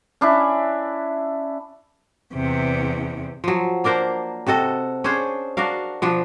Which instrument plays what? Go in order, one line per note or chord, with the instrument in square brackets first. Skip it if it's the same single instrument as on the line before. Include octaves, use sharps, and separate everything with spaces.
[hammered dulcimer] C#4 D4 E4 E5
[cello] E2 C3
[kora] F3 F#3
A#3 D4 A#4 C5
C3 F#4 A4 D#5
C#4 D4 G#4 C5
D4 F#4 A#4 F5
B2 F3 D4